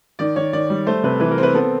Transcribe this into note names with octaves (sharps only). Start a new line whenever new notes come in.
D#3 D5
D#3 C#5
D#3 D5
G3
A3 C5
C3 B4
E3 B4
A#4
C4
B4
B3 A4